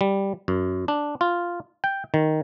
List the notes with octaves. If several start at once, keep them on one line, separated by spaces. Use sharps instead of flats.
G3
F#2
D4
F4
G5
D#3